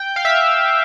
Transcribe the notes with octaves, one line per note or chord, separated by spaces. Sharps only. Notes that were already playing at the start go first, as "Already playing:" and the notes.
Already playing: G5
F5
E5